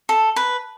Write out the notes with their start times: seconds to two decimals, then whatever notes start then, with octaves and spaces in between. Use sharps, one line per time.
0.09 A4
0.36 B4